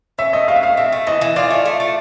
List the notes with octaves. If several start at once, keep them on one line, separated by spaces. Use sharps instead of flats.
C#4 E5
A3 D#5
F#3 F5
E5
A3 F5
C4 E5
A3
E3 D#5
E3
F4 D5
A3
A3
A3